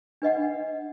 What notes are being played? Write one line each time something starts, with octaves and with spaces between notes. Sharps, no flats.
D4 B4 D#5 F#5